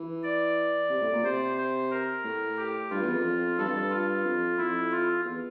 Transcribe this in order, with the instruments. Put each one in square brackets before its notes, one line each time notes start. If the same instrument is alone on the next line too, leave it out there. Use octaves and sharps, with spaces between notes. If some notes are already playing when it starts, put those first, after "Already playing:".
Already playing: [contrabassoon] E3
[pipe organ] D5
[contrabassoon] C3
A2
A#2
[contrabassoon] C3 [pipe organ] C5
[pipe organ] C5
A#4
[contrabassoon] A2
[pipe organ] G4
[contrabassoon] G2 [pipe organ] F4
[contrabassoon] E2
F2
F2
[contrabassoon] G2 [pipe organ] A4
[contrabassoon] F2
G2
[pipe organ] F4
[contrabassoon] F2
[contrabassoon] F2 [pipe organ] E4
[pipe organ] F4
[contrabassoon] E2